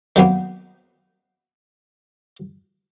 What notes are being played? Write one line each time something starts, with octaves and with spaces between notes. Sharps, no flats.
D#3 F#3 A#3 B3